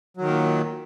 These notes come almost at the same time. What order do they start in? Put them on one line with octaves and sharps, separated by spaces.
F#3 D#3 A#2